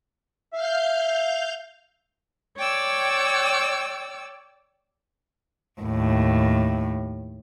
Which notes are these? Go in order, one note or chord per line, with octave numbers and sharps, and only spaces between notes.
E5 F5 F6 G6
C#5 D5 G5 E6
D#2 A2